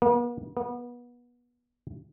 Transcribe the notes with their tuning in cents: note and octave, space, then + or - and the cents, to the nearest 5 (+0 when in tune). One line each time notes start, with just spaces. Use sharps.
B3 -45
B3 -25